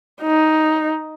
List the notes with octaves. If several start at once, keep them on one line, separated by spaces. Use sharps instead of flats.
D#4